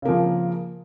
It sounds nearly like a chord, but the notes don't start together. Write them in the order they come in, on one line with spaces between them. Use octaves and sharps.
C#3 A#3 F3